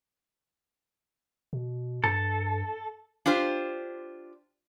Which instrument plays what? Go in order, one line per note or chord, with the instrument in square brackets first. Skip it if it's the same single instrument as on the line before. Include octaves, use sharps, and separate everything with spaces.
[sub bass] B2
[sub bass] G2 [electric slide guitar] A4
[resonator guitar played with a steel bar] D4 F4 G4 C5